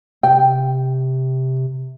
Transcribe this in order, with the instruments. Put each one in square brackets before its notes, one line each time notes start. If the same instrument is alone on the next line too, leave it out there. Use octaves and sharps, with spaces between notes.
[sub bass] C3 [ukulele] G5